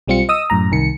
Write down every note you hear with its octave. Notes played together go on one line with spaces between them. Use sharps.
B1 G3 C4 F4 C#7
D#5 D#6 E6
F#2 A2 A#5
C2 D#3 C#7